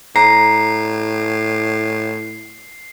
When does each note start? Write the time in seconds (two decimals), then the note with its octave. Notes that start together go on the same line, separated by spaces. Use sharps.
0.16 A2 A#5 C7